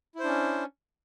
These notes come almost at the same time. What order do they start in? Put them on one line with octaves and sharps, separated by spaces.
E4 C5 D4 C#4